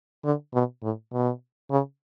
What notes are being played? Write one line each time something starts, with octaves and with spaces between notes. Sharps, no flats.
D3
B2
A2
B2
C#3